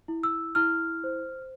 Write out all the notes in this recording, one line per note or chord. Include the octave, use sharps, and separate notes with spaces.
E4
E6
E4 F6
C5